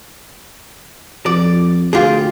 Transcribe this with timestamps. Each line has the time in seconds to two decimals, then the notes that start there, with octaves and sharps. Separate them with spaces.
1.26 F2 D5
1.93 D2 F4 G4 G#4